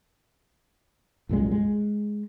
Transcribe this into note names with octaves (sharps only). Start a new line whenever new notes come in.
C2 F#2 A#2 G#3
G#3